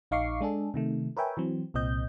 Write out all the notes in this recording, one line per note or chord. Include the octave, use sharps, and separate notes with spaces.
A#1 D#4 F5 C#6 D6 C7
G#3 D4 G#4 A4
C3 D#3 A3
A#4 B4 C#5 E5 G5 G#5
E3 F#3 C4
C2 A#2 C4 D#5 G6